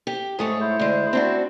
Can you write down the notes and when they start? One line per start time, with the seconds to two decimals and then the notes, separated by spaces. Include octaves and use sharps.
0.07 G4
0.39 G#2 A3 G#4 C#5
0.61 E4 C5
0.80 D2 G#3
1.13 C4 D4 F#4